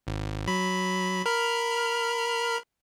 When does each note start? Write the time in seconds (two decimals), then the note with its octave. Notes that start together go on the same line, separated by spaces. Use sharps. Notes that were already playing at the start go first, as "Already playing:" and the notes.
0.07 G#1
0.48 F#3 B5
1.26 A#4 B5 F6